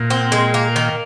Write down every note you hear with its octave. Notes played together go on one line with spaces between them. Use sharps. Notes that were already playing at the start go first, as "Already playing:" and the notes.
Already playing: A#2
C4
G#3
A#3
D#3